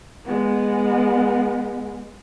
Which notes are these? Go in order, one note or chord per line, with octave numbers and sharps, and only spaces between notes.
G#3 B3